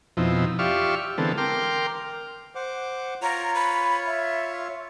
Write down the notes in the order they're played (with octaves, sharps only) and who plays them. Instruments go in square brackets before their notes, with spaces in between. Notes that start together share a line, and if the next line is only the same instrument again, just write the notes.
[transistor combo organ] F2 B2 F3 C4 D#4 E4
F4 G4 D5 E5 F5 C#6
D3 E3 G#3 B3 C4 A4
A#4 G5 C6 D6 F6
[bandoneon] C5 F#5 D6
[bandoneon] F4 C#5 [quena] A#5
[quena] B5
E5